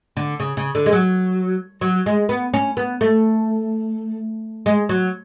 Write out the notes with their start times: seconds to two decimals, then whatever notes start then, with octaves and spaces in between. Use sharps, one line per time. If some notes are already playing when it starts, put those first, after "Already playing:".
0.17 D3
0.40 C#3
0.57 C#3
0.75 D3
0.86 G#3
0.93 F#3
1.81 F#3
2.06 G#3
2.29 B3
2.54 C#4
2.77 B3
3.01 A3
4.66 G#3
4.89 F#3